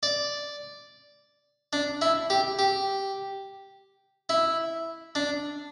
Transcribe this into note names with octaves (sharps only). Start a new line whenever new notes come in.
D5
D4
E4
G4
G4
E4
D4